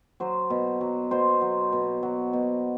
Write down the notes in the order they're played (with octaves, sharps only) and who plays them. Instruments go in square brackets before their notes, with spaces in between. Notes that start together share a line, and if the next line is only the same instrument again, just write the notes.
[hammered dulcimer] F#3 C5
B2
F#3
B2 C5
F#3
B2
F#3
B2